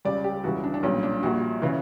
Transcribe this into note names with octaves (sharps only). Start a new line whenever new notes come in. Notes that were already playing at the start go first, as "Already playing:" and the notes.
C#2 C#3 G3 D5
G4
C#2 C#3 E3 G3 F#4
D4
D4
B1 A#2 G3 C#4
D4
A#1 A#2 G3 F#4
C#3 E3